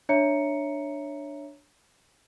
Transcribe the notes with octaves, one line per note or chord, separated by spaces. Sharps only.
D4 C#5 E5 A#5 C#7